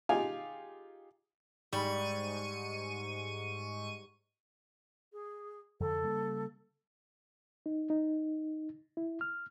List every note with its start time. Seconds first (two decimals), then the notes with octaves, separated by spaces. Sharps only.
0.09 D#4 F4 G4 G#4 F5 G#5
1.73 G#2 G3 C#6 D#7
5.13 G#4
5.80 F2 D3 A4
6.03 C#3 G3 A#3
7.66 D#4
7.90 D#4
8.97 E4
9.21 F6